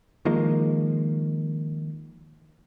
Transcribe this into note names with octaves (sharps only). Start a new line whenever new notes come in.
D#3 F3 G#3 A#3